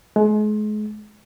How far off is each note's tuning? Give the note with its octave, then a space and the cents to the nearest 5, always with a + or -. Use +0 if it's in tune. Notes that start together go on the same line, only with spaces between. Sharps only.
G#3 +35